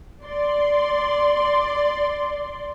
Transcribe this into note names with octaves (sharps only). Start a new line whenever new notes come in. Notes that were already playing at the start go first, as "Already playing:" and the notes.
D5 C6